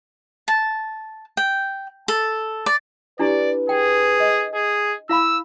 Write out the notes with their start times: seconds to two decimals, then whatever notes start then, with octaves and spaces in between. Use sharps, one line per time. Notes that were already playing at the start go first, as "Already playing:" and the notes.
0.48 A5
1.37 G5
2.08 A4
2.66 D5
3.19 D4 E4 G4 B4 D5
3.69 G#4 G5
4.20 D#5
4.55 G#4
5.09 E4 F5 B5 E6